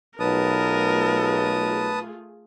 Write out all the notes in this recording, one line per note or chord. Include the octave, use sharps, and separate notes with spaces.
B1 A3 F4 G#4 A#4 B4 A5 D#6